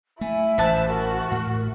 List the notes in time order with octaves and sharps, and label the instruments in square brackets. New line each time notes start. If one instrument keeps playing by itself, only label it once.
[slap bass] A3 [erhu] E4 [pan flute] G#5
[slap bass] A1 [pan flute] C5 [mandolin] E5 A5 F#6
[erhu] F#4 [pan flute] A#4
[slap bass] A2